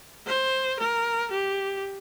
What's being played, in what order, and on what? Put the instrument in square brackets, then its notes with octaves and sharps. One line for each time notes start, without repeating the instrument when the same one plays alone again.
[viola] C5
A#4
G4